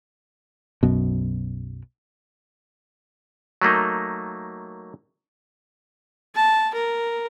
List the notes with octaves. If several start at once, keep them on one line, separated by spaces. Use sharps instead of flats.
B1 F#2 B2
F#3 A3 A#3 D#4
A5
A#4